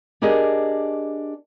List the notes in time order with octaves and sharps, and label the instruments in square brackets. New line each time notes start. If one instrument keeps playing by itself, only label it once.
[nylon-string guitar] D4 G4 G#4 A#4 D#5